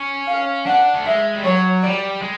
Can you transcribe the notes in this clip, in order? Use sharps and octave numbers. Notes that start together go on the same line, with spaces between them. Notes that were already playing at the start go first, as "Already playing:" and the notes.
Already playing: C#4
F5
D4 F#5
A3
G#3 E5
G3
F#3 C#5
G3 D5
G#3